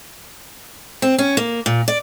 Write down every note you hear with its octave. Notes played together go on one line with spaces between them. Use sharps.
C4
C#4
A#3
A#2
D5